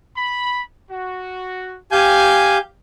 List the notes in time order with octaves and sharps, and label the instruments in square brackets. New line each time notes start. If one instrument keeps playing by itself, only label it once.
[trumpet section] B5
F#4
[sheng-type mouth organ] G4 F5 G6 [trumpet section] G#5